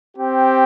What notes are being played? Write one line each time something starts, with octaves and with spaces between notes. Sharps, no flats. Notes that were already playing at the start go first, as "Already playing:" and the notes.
C4 G4